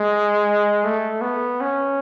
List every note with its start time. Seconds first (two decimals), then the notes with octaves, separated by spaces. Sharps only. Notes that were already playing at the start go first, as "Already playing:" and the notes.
Already playing: G#3
0.84 A3
1.22 B3
1.61 C#4